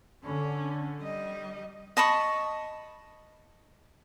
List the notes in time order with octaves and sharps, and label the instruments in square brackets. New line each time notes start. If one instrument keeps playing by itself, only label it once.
[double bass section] D3 [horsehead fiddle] C#4
[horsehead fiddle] G3 D#5
[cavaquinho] D#5 A5 B5 C#6